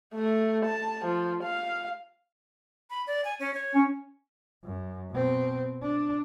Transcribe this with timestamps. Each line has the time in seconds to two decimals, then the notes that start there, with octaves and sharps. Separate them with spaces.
0.14 A3
0.65 A5
1.05 F3
1.43 F5
2.90 B5
3.07 D5
3.25 G#5
3.40 C#4
3.54 C#5
3.75 C#4
4.65 F#2
5.12 B2 C4
5.82 D4